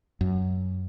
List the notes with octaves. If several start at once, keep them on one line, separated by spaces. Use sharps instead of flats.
F#2